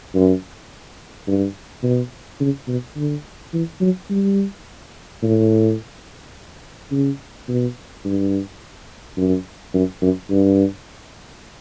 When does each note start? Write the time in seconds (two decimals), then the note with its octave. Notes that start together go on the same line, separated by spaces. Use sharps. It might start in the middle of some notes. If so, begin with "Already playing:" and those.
0.15 F#2
1.28 G2
1.83 B2
2.40 C#3
2.68 B2
2.97 D3
3.54 E3
3.81 F#3
4.10 G3
5.23 A2
6.92 C#3
7.48 B2
8.05 G2
9.17 F#2
9.74 F#2
10.02 F#2
10.30 G2